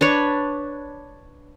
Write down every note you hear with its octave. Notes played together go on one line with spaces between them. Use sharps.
D4 B4 C#5